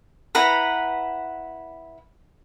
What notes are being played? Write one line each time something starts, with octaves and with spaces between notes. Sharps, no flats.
E4 B4 F#5 A#5